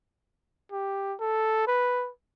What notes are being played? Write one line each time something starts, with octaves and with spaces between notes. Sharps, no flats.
G4
A4
B4